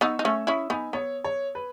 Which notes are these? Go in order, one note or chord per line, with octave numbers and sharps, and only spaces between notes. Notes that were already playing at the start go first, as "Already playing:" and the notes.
B3 D#4 C#6 E6
D#4
A3 C#4 C#6 E6
C#4 E4 B5 D#6
B3 D#4 G#5 B5
B3 C#5
C#5
B4